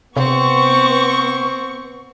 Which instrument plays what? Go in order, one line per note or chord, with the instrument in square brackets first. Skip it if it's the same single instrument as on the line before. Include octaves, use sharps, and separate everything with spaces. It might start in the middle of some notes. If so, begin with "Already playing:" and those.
[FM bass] C3 [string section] B3 C#6 [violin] C4